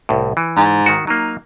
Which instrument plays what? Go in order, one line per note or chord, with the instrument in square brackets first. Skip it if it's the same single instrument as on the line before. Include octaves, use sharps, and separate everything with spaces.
[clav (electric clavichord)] C2 A2
E3
[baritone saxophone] G#2
[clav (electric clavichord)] D#3 F#4
[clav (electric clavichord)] F#3 A#3 [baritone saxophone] D#4